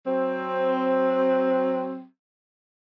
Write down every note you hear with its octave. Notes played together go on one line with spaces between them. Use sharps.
F#3 C4